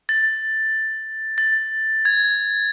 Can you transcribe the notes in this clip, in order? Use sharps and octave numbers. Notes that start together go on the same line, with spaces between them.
A6
A6
G#6